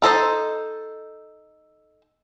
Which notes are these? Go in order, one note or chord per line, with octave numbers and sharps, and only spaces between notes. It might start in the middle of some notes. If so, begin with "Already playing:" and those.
D#4 A4 C5 D#5